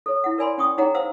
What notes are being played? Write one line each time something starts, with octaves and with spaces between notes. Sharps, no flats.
A4 C#5
E4 F#5
A#4 D5 G#5 B5 C6
C#4 G5 C#6 D#6
D#4 G#4 C#5 F#5 G5 A#5
C5 F5 F#5 E6